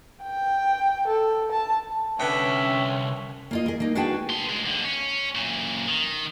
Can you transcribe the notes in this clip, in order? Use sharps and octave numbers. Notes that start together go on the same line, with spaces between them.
G5
A4
A5
C2 B2 D3 B3 C#4 E5 G5
A#3 F4 D#5
G#4 A#4
A#3 D#4
D4 F#4 G#4 B4 G5 A5
B3 C6
D2 G#3
D#2 D3
C#4
F#2 A#2
D#3